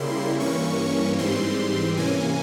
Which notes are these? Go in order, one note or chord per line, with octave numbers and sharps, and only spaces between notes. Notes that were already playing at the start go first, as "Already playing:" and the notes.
Already playing: C#3 G3 A#3 E4 C6
G2 E3 A#3 C#4 C#6
G#2 E3 G3 C4 C6
C3 E3 A#3 C#4 G#5